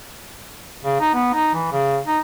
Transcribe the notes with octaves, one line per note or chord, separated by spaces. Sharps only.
C#3
D#4
B3
D#4
E3
C#3
D#4